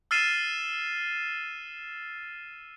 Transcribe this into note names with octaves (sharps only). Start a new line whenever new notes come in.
E6 F6 A6 C7 D#7 E7